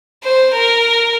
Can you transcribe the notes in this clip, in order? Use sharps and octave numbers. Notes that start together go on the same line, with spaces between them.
C5
A#4